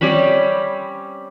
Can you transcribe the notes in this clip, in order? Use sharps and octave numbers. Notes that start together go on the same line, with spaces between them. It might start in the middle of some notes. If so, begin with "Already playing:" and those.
G3 C4 C#4 B5